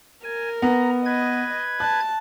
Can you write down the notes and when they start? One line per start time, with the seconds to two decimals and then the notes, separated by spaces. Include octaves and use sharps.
0.24 A#4 G#5
0.62 B3 A#5
1.06 B4 D#5 G#6
1.80 A5 F#6